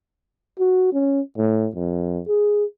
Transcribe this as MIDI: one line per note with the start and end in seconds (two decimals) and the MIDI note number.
0.59 0.91 66
0.93 1.21 61
1.38 1.67 45
1.75 2.21 41
2.28 2.65 68